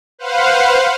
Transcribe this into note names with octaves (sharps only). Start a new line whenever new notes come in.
B4 C5 F5 F#5